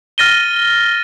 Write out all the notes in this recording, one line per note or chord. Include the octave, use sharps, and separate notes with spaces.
F6 A6 A#6 D#7 G7